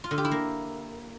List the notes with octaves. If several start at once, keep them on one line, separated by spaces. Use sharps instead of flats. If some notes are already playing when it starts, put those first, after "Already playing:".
F4
D3
G4
E4
A#3